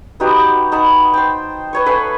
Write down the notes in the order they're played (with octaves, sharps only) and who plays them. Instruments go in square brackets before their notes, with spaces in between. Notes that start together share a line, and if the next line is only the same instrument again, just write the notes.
[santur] B3 D#4 F#4 G4
D#4 F#5 A5 B5
C5 G5
B4 C#5 C#6
A4 B4 F5 G#5